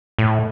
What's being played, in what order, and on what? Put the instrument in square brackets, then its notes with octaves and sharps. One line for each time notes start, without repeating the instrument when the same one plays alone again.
[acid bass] A2